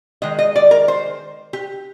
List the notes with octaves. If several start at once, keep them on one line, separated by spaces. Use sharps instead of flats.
D#3 G#3 D#5
D#5
D5
A#4
C5
G4